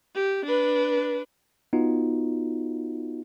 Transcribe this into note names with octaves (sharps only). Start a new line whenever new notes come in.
G4
D4 B4
B3 D#4 F4 F#4